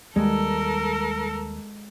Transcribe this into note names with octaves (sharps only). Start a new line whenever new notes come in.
D#2 G3 G#3 A4 A#4